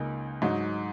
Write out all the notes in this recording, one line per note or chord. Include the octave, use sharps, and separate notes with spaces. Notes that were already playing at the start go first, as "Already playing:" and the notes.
Already playing: C#2 C#3 A#3 D#4
G#2 F#3 D#4